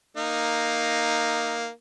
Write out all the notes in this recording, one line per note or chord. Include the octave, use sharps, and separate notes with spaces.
A#3 D#4